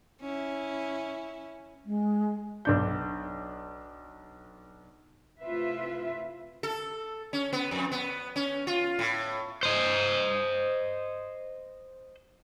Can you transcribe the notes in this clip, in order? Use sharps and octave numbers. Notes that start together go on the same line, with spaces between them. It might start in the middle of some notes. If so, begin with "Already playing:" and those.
C#4 E4
G#3
B1 D4 G6
C3 A3 E4 F4 B4 E5
A4
C#4
B3
F2
B3
C#4
F4
A2
C5 D#5